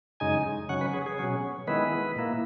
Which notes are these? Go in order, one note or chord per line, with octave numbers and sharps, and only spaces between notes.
F#2 C#3 G#3 D#4 G#5
C#3 F#3 C#4 F#5
B4
G#4
G#4
B2 F#3 C#4
D#3 G#3 B3 E4 B4
A#2 A#3 E4